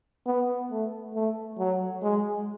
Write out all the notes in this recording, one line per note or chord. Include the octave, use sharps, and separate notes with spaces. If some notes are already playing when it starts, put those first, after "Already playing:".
B3
A3
A3
F#3
G#3